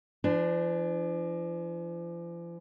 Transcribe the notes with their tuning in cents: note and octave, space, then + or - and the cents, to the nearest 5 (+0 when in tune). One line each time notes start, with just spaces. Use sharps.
F3 -45 D4 +10